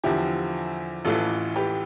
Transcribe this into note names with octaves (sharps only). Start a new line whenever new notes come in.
E2 D3 F3 E4 G4
A1 A2 E3 F4 A4
G4 B4